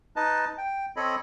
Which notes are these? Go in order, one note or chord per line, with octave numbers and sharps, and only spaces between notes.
D#4 B4 D#5 A5
G5
C4 A4 C#5 D#5 B5